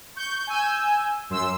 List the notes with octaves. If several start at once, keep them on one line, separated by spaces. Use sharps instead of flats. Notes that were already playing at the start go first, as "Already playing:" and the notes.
C#6 G6
G#5 E6 G6
F#2 C6 E6